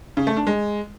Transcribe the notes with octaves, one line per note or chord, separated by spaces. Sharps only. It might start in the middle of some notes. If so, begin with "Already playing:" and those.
C#3
A3
D4
G#3